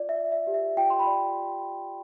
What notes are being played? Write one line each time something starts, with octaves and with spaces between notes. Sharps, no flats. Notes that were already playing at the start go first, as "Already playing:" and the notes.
Already playing: F4 D5
E5
D5
E5
G4
E5
F4 G5
C6
B5
D5